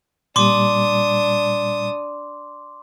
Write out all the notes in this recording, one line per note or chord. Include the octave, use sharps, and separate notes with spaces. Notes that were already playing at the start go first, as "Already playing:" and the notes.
A#2 G3 D4 C6 D6 D#6